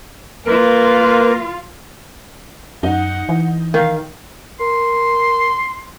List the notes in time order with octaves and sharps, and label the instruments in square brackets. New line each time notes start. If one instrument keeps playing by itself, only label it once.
[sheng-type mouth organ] A#3 A#4 [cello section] F4 [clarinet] B4
[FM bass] F#2 [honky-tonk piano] D#4 [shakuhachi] F#5
[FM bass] E3
[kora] D#3 [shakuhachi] F5
[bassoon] A#4 [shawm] C6